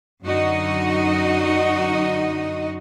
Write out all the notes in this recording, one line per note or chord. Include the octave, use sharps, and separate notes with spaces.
F#2 D3 D#4 F#4 D#5